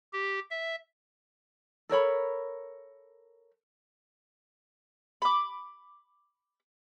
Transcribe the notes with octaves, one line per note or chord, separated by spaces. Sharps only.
G4
E5
A4 A#4 C#5 B5
B5 D6